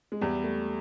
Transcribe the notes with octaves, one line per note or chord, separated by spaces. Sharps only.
G#3
E2 G3
A3